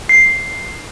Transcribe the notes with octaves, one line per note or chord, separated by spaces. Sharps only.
C7